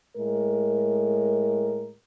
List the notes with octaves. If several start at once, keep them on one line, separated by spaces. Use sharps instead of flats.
A2 G#3 A#4